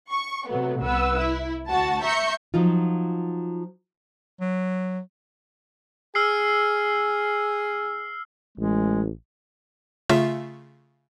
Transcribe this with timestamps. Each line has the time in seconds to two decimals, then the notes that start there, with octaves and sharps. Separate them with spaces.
0.11 C#6
0.47 C3 F#3 A3 B3
0.81 C2 B3 B4 E6
1.18 E4
1.69 D2 F#4 A5 A6
2.03 E5 A#5 C#6 G6 C#7
2.54 F3 F#3 D#4 F4
4.40 F#3
6.15 G#4 E6 F6 C7
8.58 A1 G#3
10.09 C#3 A3 F4 E5 E7